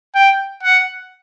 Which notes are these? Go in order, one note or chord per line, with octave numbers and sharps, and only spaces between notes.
G5
F#5